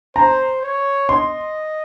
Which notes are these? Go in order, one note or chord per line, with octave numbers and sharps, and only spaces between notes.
C5 A#5
C#5
D#5 C6